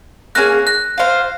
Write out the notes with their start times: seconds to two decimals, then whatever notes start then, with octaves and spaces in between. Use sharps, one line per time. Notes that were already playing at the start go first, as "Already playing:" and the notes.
0.35 A#3 C#4 G#4 F#6 A#6
0.67 F#6 A#6
0.98 F4 C5 F5